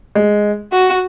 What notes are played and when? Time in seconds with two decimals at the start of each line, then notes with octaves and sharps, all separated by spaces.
0.15 G#3
0.72 F#4